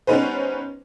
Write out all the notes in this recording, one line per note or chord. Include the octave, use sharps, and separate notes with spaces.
G3 B3 C#4 D#4 B4 C5